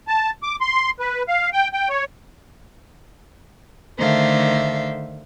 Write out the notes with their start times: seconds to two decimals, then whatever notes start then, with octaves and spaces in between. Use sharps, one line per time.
0.08 A5
0.43 D6
0.61 C6
1.00 B4
1.28 F5
1.53 G5
1.73 G5
1.89 C#5
3.98 D3 D#3 A3 C5 E5 F5